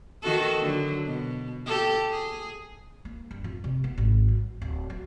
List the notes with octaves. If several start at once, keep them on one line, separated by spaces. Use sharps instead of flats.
D#3 F#4 A4
D3 F#3
B2
G4 A4
G#4
A#3
G2
F2
C3
B3
G#1
F#3
D1
F#3